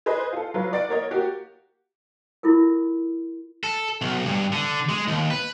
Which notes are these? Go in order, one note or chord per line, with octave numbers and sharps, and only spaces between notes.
G#4 B4 C5 D#5
F4 A4
F#3 F4 B4
D5 F#5 A6 D7
A#3 A#4 C#5 D#5
A#3 F#4 G4
E4 F4 A4 A#4
A4
B1
G2
D3
G#3
D#2
B4